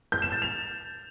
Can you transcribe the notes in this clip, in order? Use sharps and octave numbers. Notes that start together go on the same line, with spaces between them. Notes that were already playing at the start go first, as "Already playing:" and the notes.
G6
E7
A6
F7